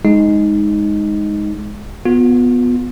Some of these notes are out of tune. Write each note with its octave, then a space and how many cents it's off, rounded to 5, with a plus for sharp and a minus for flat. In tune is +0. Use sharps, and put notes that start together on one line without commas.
G#3 +0 D#4 +0
B3 +0 F4 +40